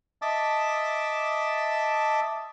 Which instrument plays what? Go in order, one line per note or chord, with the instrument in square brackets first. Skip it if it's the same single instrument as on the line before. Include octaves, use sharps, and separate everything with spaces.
[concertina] D#5 E5 A5 D6 E6